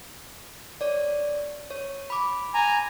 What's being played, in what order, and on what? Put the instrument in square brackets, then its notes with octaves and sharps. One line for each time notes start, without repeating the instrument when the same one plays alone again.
[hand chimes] C#5 D5
C#5
B5 D6
[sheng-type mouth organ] G#5 A#5